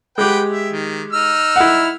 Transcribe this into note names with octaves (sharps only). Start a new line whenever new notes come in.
G#3 G4 B4 F#5 G5
E5
D#3
D#4 E6 F6
E4 F#5